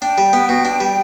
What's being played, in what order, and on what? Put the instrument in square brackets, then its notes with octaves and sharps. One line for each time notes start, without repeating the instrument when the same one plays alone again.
[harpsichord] D4 [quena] G5
[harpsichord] G3
B3
B2
D4
G3